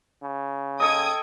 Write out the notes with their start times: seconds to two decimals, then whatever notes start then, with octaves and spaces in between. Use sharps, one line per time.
0.22 C#3
0.80 A4 D#5 G5 D#6 G#6